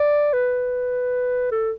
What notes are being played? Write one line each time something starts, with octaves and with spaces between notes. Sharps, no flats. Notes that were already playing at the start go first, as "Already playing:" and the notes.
Already playing: D5
B4
A4